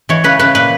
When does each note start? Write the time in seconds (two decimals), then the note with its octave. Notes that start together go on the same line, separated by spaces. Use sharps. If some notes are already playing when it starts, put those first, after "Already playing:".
0.09 E3 C#5
0.24 C#3 B4
0.39 C#3 B4
0.55 A#2 B4